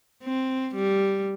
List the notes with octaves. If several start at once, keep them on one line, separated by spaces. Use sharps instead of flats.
C4
G3